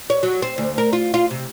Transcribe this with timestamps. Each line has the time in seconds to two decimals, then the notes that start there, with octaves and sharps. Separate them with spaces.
0.10 C#5
0.23 F#3
0.42 C4
0.58 D2
0.78 A#4
0.93 F4
1.14 F4
1.31 C3